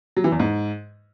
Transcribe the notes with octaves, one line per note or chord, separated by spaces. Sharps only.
F#3
E3
E2
G#2